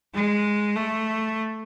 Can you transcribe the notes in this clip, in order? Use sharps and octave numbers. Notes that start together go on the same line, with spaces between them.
G#3
A3